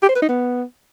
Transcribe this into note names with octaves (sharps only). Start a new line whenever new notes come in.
G4
C5
B4
D#4
B3